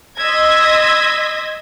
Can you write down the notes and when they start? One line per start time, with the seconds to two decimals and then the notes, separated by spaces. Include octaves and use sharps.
0.18 D#5 C6 E6 G#6 A#6 B6